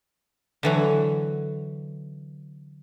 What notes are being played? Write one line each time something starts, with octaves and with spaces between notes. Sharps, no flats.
D3 E3 F#3